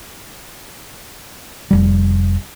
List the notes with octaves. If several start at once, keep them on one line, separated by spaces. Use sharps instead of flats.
F1 G3